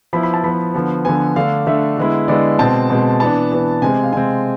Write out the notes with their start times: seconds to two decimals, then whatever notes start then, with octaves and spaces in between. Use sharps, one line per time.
0.13 F3 B3 E4 B5
0.23 B5
0.34 A5
0.44 F3 B3 E4 B5
0.74 D3 F3 B3
1.05 D3 F3 B3 G#5
1.36 D3 A3 D4 F5
1.67 D3 A3 D4 E5
1.98 D3 G#3 B3 E4
2.28 D3 G#3 B3 E4 D5
2.59 B2 G#3 C4 A5
2.90 B2 G#3 C4
3.20 E3 B3 D4 A5
3.52 E3 B3 D4
3.82 C3 G#3 C4 G#5
4.04 F5
4.13 C3 G#3 C4 G#5